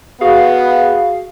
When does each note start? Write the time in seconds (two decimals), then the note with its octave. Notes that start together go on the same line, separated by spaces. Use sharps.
0.21 B3 F#4 G#4 F5